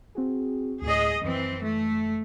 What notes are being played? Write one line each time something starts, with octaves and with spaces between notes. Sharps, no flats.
C4 F#4 G#4
D2 A2 G#4 D#5
F#2 E3 C4
A3